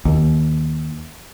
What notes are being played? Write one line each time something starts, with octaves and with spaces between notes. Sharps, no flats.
D#2